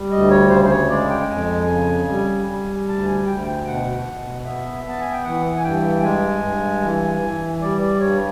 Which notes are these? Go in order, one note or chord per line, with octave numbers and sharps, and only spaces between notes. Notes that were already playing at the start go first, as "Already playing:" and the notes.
Already playing: G3
D2 D#5
C#5
C#3 C5
C5
C#5
G#3 D5
G5
G5
F2 G#5
C#3
G3
G3
D2 A5
G#5
D2 G5
G5
B2 F#5
B2
B3 E5
B3 A5
G#5
G5
E3 F#5
G#5
G2 G5
G#3 G#5
G2
E3
E3
G3 D5
D5
G2 C#5